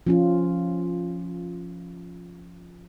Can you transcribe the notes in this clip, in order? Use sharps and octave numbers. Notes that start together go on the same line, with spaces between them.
F3 C#4 F4